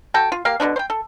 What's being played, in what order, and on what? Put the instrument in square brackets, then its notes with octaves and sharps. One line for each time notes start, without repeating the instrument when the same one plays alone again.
[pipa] F#4 A4 G5 A5
F4
A#3 G4 F5
B2 D3 F3 D4
C5 G5
A4